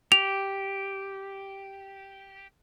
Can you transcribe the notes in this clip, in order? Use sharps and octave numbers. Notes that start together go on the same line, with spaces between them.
G4 F7